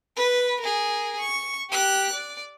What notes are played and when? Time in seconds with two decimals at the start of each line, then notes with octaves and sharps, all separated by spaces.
0.16 B4
0.60 G#4 A#4
1.20 C#6
1.70 G4 F#6
2.12 D5